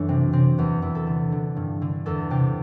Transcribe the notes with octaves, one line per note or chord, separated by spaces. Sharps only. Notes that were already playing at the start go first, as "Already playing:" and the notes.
Already playing: F#2 E3 D4 A4
C3 C4
C3 C4
E2 B3
E2 E4
A4
D3
D3
G2
D3
E2 A4
C3 G4